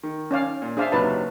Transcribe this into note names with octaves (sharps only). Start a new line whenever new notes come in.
D#3
C#4 D5 F5
A#2
D4 G#4 C5 D5 E5 F5
F#1 C3 F#3 D#4 B4 A5